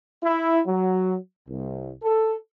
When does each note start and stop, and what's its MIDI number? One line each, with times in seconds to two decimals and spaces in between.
0.23 0.59 64
0.67 1.16 54
1.48 1.90 36
2.04 2.36 69